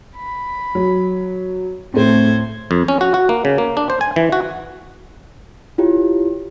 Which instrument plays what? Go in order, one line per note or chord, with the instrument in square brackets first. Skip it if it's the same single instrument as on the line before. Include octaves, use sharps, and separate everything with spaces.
[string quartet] B5
[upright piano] F#3
[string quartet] A2 C5 G#6 [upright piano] A3 C4
[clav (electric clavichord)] F2
C#4
F#4
F#4
A#3
C#3
A#3
D4
C5
G#5
E3
F#4
[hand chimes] E4 F4 G4 C#5